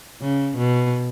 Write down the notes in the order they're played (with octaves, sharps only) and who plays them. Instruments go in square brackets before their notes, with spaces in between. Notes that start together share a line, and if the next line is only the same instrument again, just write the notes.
[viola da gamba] C#3
B2